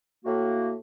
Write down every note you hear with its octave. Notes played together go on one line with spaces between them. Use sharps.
A2 A#3 F#4